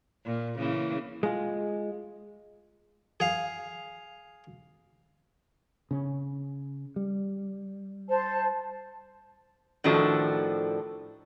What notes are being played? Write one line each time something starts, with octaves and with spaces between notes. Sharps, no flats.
A#2
C#3 E3 A#3
G#3 F4
G#4 F5
C#3 C#4
G3
C5 A5
A2 D#3 F3 D4 F#4 A4